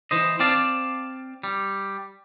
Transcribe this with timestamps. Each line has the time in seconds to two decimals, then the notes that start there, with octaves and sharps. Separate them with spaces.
0.11 E3 C5 D#5
0.40 C4 D5 F5 A5
1.43 G3